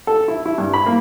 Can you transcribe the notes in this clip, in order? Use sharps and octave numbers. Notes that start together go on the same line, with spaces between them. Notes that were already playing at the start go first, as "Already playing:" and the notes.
A4
E4
E4
G2
B5
A#3